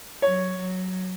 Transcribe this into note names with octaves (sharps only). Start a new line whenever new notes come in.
F#3 C#5
F#3